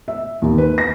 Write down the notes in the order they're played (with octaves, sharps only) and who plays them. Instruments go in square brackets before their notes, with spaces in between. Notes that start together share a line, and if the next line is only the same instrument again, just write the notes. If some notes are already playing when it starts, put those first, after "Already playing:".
[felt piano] E5
D#2
B4
A#6